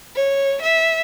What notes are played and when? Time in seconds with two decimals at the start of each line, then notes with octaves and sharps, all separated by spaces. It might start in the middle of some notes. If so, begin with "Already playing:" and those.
0.16 C#5
0.61 E5